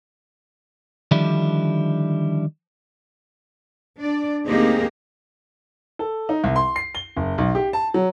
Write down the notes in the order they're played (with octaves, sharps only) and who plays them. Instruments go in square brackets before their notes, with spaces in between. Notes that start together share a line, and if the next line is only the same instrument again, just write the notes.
[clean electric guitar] D3 D#3 F3 G3 D4 E4
[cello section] D4 D5
D2 A#3 C4 D#4 G4 G#4
[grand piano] A4
D#4
C2
C6
C7
G7
F#1
B1
G4
A5
F#3